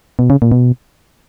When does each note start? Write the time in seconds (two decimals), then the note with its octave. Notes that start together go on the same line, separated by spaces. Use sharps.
0.19 B2
0.30 C#3
0.42 A#2
0.52 B2